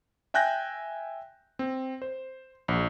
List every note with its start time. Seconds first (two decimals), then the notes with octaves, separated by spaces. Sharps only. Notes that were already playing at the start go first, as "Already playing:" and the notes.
0.34 E5 G5 G#5 F#6 G6 A#6
1.59 C4
2.02 C5
2.68 A#1